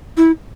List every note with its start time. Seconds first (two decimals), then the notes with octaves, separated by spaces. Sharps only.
0.17 E4